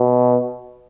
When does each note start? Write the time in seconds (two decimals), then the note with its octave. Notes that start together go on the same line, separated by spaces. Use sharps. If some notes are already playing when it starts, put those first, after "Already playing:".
Already playing: B2